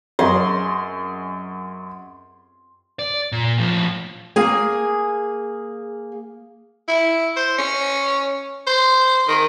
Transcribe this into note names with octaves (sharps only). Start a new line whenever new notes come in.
F#2 G#4 D#5 C6
D5
A#2
A2 F3
A#3 G#4 G#5
E4
C5
C#4
C5
D#3